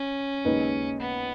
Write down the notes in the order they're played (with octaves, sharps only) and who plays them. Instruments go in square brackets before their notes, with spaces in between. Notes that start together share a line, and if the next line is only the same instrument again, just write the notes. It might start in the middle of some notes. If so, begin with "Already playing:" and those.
Already playing: [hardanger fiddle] C#4
[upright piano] D#2 C#3 G#3 D#4 B4
[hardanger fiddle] B3